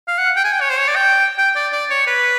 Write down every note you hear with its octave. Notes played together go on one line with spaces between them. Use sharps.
F5
F#5
G5
G#5
G5
C#5
C5
C#5
D5
G5
G5
D5
D5
C#5
B4